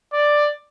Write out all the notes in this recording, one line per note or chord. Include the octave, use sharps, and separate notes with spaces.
D5